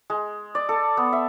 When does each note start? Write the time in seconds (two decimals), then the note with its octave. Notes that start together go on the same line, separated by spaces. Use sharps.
0.10 G#3
0.55 D5
0.69 A4
0.97 B3
1.13 E5